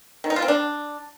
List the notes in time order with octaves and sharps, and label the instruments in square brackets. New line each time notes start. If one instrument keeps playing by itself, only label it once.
[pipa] D#3
D#4
F4
C4
D4